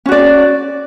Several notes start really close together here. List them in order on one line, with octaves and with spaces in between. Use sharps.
C#4 F#4 D5